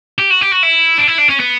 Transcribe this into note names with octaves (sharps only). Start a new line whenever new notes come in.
G4
F#4
G4
F#4
E4
D4
E4
D4
C#4
B3